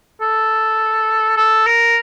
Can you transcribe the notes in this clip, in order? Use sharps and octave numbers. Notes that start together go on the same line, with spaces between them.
A4
A4
A#4